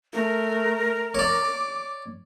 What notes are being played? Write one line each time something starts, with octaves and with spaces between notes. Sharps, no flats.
A3 A#4
C#5 D5 D6